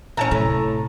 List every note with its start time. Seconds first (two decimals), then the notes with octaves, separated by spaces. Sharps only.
0.17 E3 C#4 A5 A#5
0.31 A2 C3